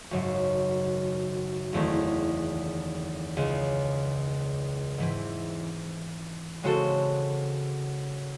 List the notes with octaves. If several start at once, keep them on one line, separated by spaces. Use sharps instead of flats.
G#1 F#2 C#3 F#3
F#1 E2 D#3 A3 C4
C#2 C#3 G#3
G#2 E3 C4 E4
C#3 G#3 C4 F#4 A4